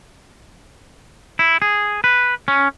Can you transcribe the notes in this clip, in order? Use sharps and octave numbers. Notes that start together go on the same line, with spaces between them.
E4
G#4
B4
C#4